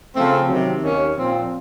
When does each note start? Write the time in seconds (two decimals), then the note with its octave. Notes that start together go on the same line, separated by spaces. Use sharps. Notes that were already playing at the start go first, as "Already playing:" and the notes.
0.16 C#3 F3 A3 C4
0.48 C3 D#3 F#3
0.81 D#2 D#3 A#3 C#4
1.15 A#2 F3 C4